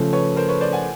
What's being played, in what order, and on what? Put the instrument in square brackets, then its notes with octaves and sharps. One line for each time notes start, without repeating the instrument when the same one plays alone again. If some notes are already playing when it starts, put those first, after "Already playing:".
Already playing: [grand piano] C#3 F3 A3
[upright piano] B4 C#5
A#4 C5
B4 C#5
C5 D5
F#5 G#5